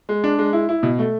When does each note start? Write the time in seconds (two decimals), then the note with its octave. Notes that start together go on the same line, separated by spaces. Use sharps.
0.09 G#3
0.24 D4
0.38 G#3
0.53 E4
0.69 E4
0.83 B2
0.99 A3